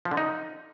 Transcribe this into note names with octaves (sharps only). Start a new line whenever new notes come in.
F3
D3
D#4